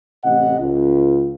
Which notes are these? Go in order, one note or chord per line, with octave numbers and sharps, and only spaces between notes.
A1 A2 C3 D#5 F#5
C#2